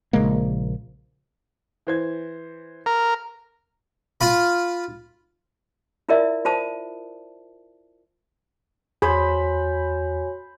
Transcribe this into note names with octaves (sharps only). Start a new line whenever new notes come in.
A#1 C#3 G#3 A#3
E3 C5 G#6
A#4
F4 B5
E4 F4 A#4 D5 E5
F4 C5 A5 D#6
E2 F#4 G#4 C5 C#5 G#5 B5